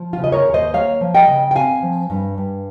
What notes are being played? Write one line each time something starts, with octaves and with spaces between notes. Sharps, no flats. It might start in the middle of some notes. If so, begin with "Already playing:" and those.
Already playing: F3
F4
C#3 D#5
A#4 C#5
D#2
C5 D#5
A#3 C#5 F5
F3
D#5 G5
C#3
G5
C4 F5 G#5
F3
G2
G2